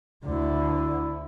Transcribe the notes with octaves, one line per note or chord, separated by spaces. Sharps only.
D2 D3 E4